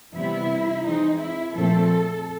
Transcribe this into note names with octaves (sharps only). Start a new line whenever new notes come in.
C3 E3 G3 B3 E4
E3 G#3 C4 D#4
E4
A#2 F3 A3 C4 A4